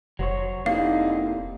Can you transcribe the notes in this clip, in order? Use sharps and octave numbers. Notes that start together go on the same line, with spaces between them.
F1 F#3 C5 C#5
D3 A#3 C4 D#4 E4 G4 F5